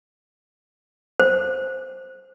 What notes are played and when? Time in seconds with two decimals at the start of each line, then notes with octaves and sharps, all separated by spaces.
1.20 C5